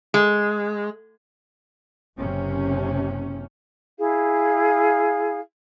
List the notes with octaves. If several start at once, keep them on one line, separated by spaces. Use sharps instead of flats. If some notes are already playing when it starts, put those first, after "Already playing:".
G#3
F#1 C3 C#4
E4 G#4 F5